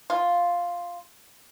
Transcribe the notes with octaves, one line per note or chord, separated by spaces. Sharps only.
F4